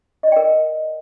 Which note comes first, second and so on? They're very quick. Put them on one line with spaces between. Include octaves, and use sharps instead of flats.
D#5 D5 G5 A#4